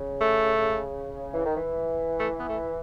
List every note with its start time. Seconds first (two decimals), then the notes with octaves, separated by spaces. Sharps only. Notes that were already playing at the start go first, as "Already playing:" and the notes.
Already playing: C#3
0.21 A3
1.34 E3
1.45 D#3
1.56 E3
2.20 A3
2.39 B3
2.49 A3